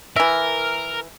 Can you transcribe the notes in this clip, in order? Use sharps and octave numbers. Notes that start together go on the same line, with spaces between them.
E3 A#4 E5